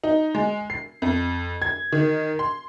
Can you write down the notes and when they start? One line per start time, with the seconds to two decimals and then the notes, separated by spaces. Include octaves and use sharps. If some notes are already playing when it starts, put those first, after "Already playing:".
0.04 D#4
0.35 G#3
0.70 C7
1.02 F2
1.62 G#6
1.92 D#3
2.39 C6